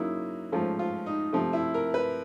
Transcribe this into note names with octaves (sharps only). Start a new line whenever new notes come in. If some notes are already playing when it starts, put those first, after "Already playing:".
Already playing: C#3 F#3 A#3 D#4 E4
G#2 F3 A3 C#4 F4
F4
D#4
C3 F3 A3
E4
A#4
B4